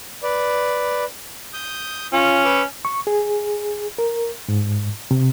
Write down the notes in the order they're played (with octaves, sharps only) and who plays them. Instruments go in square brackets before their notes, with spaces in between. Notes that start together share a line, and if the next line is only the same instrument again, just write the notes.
[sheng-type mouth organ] B4 D5
D#6 G6
[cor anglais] C#4 [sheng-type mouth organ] F4
[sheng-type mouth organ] B4 D6 E6
[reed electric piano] C#6
G#4
A#4
G#2
C3